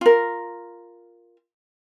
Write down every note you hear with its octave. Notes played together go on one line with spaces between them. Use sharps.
F4 A#4